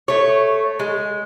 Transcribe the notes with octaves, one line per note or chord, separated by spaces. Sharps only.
A3 C#5
G#3